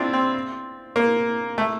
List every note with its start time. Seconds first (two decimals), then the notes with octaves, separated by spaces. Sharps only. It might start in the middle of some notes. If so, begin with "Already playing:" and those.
Already playing: C4 D4 E4 F4
0.13 C4
0.96 A#3
1.58 A3